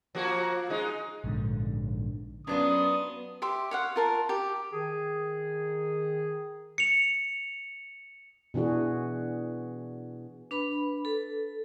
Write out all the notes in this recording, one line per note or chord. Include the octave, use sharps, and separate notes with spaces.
F3 A#3 F#4
G#3 D#4
A#1 G#2 D3
F#2 F#3 B3 D4 F4 D#6
G4 E5 C6
C#5 F5 F#5
F4 A#4 A5
G4
D#3 G#4
C#7 F7
B2 E3 D4 F#4 G#4
D4 B4 B5
A4